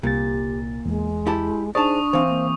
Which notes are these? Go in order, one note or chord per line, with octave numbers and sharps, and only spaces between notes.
C2 A#2 G4 A6
E2 G#3
E4 G4 A5
D4 D#4 G#4 C5 D5 A5 C#6 D#6
E3 C4 C5 F5
A#3